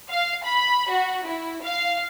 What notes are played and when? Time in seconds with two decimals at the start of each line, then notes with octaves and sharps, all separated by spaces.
0.10 F5
0.45 B5
0.92 F#4
1.26 E4
1.63 F5